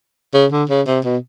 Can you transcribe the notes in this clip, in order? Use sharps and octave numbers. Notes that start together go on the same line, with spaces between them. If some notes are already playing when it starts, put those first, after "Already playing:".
C#3
D3
C#3
C3
B2